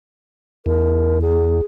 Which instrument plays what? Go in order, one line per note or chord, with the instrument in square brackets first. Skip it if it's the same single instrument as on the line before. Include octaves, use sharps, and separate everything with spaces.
[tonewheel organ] E2 [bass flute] A#4
[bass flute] G#4